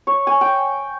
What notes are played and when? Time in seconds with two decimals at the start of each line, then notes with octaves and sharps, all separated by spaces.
0.07 C#5
0.27 G#5
0.41 G5